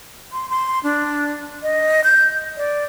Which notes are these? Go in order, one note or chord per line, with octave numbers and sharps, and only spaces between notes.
C6
C6
D4
D#5
G6
D5